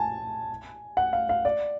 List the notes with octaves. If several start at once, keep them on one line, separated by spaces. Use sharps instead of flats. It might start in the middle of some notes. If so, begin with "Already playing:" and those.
Already playing: G#5 A5
F#5
F5
F5
D5